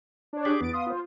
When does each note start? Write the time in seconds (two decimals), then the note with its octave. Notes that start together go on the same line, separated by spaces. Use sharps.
0.33 D4 C#5
0.45 G4 G#4 D5
0.61 E2 B3 A6 D7
0.73 F5 C6 D#6
0.87 F4 C5